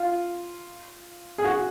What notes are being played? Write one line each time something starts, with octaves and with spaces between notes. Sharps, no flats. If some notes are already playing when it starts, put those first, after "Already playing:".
Already playing: F4
G#4
F#4